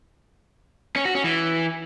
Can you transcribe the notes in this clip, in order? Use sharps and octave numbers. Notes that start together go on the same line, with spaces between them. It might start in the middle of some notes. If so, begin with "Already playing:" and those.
C#4
F#4
C#4
E3